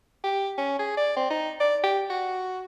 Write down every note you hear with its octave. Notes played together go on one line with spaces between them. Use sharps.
G4
C#4
G#4
D5
C4
D#4
D5
G4
F#4